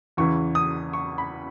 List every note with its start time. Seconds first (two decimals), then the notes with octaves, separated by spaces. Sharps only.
0.17 E2 C#3 E3 C#6
0.55 D#6
0.93 C#6
1.18 B5